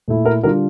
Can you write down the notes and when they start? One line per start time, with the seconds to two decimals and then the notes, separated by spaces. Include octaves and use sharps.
0.08 A#2 A3 E4
0.25 A#4
0.43 D3 G3 D4 F4 A#4